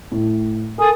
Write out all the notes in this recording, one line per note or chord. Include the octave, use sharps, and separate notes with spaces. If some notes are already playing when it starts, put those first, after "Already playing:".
A2
A4 A#4 G#5 D#6